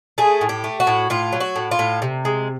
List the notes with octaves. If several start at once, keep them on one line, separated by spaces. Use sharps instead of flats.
A3 G#4
A2
G4
A3
F#4
A2
A2 F4
F#3
F#4
A2
F4
A2
C3
G#3